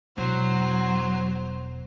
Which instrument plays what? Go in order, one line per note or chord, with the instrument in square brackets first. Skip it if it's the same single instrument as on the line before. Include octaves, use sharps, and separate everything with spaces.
[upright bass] E1 [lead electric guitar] F#3 [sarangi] C5